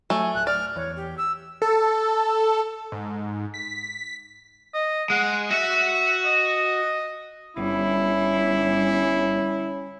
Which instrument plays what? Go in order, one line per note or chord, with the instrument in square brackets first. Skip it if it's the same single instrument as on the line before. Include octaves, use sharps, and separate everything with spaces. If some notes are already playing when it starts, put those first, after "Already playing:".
[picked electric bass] F#3 [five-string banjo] A3 [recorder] G#5
[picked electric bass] D1 [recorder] F#6
[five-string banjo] D5 [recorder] F6
[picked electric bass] E2 [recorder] C#5
[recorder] G4
E6
[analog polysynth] A4
G#2
B6
[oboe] D#5
[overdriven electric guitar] G#3 [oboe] F#5
[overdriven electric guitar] F#4 F#5 [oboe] E5
[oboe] D#5
[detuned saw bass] G1 [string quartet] G3 [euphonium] C#4 [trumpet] E4